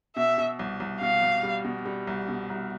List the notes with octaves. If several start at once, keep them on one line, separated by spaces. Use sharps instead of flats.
B2 E5
B2
C2
C2
B2 F5
C2
G3
B2
G3
C2
B2
C2